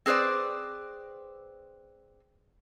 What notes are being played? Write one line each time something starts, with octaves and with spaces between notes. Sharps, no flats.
C4 G#4 B4 C5 D5